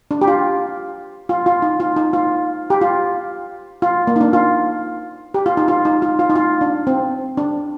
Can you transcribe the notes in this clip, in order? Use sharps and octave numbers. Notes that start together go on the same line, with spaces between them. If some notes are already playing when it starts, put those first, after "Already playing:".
D4
G4
F4
F4
F4
D#4
F4
D#4
F4
G4
F4
F4
A#3
D#4
D4
F4
G4
F4
D#4
F4
D#4
F4
F4
D#4
F4
D4
C4
D4